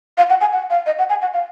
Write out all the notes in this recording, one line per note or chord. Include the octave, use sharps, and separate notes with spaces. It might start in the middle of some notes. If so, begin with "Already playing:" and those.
F5
F#5
G#5
F#5
F5
D#5
F#5
G#5
F#5
F5